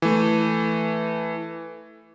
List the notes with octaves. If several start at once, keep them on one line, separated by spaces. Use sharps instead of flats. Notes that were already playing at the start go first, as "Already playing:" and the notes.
E3 A3